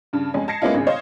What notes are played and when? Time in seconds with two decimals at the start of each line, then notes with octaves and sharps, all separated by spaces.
0.13 G2 C#3 A5
0.34 F2 G#3 C#4 G#5
0.47 D#5 A5 G#6 A#6 C7 C#7
0.62 G#3 A#3 B3 C#4 E4 F4
0.74 G#1 C#3 G#4
0.87 C5 C#5 D#5 F5